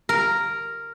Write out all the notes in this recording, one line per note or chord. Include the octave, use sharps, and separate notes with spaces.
A#4